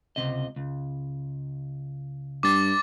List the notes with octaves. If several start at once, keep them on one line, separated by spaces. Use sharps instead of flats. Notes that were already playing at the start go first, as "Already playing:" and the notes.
C#2 C3 D#5
C#2
G2 D6 A6